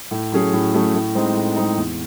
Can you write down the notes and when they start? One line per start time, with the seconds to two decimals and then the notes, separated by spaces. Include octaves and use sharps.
0.11 A2
0.32 F#3 A3 C#4 G#4
0.53 A2
0.74 F#3 A3 C#4 G#4
0.94 A2
1.15 G#3 C4 D#4
1.35 A2
1.56 G#3 C4 D#4
1.77 E2